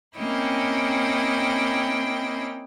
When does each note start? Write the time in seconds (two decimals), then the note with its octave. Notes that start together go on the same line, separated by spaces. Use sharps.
0.18 A#3 C4 C#4 E4 D#5 G5